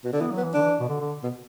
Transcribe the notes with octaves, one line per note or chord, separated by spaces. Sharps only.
B2
D3
E3 B3
F#3
B3
E3
D3 D4
E3
B2
D3
D3
B2